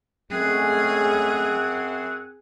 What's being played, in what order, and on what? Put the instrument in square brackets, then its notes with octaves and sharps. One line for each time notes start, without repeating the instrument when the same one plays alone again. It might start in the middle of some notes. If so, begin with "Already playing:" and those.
[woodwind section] F#2 C4 F#5 [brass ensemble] G#3 A3 C#4 [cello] G#4